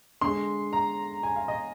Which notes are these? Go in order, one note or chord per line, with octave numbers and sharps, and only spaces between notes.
D3 G#3 C6
A#5
G#5
F5
D#5